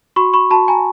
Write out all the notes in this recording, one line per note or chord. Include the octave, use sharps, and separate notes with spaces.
F#4 B5 C#6
B5 C#6
F#4 A5 B5
G#5 A#5